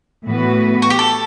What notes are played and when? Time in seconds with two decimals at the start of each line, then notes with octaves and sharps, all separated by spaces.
0.25 A2 E3 B3 F#4 B4
0.82 F#4
0.90 G4
0.99 A4